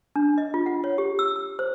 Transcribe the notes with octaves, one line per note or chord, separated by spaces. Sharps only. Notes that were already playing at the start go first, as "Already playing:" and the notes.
D4
D#5
F4
F#5
C#5
G4
E6
E6
C5